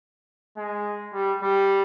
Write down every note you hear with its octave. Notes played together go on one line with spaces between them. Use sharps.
G#3
G3
G3